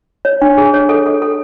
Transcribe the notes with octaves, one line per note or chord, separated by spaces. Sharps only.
C#5
D4
G#4
C#5
A4
A4
A4